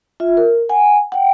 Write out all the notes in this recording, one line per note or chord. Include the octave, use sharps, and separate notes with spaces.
F4 E5
A#4
F#5 G#5
F#5 G5